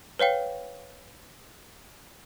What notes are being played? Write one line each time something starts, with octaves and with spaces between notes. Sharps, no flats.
B4 C#5 F5 G5